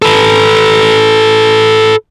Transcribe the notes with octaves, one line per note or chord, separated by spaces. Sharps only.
A4 B4